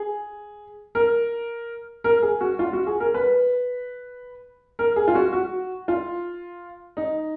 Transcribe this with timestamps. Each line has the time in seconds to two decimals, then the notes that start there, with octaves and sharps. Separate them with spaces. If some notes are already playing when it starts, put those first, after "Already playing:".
Already playing: G#4
0.95 A#4
2.04 A#4
2.22 G#4
2.41 F#4
2.59 F4
2.73 F#4
2.87 G#4
3.00 A#4
3.14 B4
4.79 A#4
4.96 G#4
5.08 F4
5.15 F#4
5.33 F#4
5.88 F4
6.97 D#4